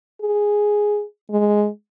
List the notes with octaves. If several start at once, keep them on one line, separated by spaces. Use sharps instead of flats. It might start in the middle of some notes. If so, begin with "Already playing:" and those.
G#4
G#3